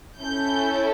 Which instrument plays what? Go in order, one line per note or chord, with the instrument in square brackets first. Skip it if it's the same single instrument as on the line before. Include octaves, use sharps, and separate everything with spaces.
[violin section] C#4 E4 A4 G6